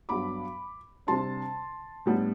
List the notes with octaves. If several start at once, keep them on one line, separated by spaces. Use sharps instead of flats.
G2 F#3 B3 D4 B5 D6
C3 G3 D4 A5 C6
A2 G3 B3 D4